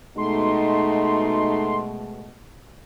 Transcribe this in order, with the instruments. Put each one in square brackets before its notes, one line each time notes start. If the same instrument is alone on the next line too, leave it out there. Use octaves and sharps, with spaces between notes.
[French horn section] B2 G#3 A3 [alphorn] D#4 [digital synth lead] C6